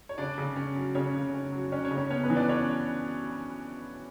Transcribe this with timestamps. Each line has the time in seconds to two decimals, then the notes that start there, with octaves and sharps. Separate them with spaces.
0.09 C#5
0.18 C#3 D4 D5
0.38 C#3
0.56 C#4
0.75 F#3
0.95 C#3 C#4 C#5
1.15 C#3
1.34 C#4
1.52 F#3
1.72 C#4 D4 C#5
1.85 C#4 C#5
1.91 C#3
1.97 C#4 C#5
2.10 B3 C#4 C#5
2.23 B3 B4
2.30 E3
2.36 D4 D5
2.48 C#4 D4 C#5